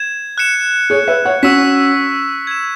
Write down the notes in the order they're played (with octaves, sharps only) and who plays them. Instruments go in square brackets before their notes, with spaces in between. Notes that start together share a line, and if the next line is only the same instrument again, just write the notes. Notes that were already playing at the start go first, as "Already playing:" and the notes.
Already playing: [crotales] G#6 E7
F#6 C#7 E7
[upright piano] G#4 C#5
B4 E5
C#5 F#5
[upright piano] C#4 F#4 [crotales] C#6 E6 B6 E7
[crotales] G#6 E7